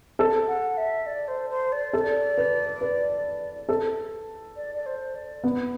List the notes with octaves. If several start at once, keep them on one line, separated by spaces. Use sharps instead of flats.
A4
F#5
E5
D5
C5
C5
D5
A4
B4
B4
A4
D5
D5
C5
D5
B3